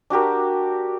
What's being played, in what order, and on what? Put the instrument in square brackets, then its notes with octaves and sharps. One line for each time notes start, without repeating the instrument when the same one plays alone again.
[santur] D4 F#4 G4 A#4